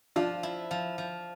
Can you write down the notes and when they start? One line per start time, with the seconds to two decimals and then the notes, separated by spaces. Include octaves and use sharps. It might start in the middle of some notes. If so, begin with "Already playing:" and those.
0.16 F3 D4 F4
0.43 E4
0.71 F3
0.98 F3